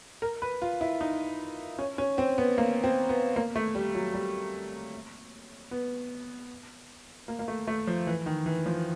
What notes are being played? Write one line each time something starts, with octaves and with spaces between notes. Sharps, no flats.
A#4
B4
F4
E4
D#4
C#4
C#4
C4
B3
A#3
C4
B3
A#3
A3
G3
F#3
G3
B3
A#3
A#3
A3
A3
F3
E3
D#3
E3
F3